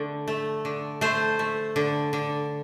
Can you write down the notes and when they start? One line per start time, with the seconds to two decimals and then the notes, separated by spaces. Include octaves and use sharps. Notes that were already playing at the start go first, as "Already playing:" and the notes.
Already playing: D3 A3
0.28 A3
0.65 D3
1.01 A3 C5
1.39 A3
1.76 D3
2.13 D3